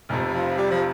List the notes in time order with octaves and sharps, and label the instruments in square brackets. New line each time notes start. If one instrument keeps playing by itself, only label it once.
[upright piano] F1 F2 C3
[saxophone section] F3
G3
F3